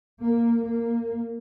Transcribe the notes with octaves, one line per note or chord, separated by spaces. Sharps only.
A#3
A#3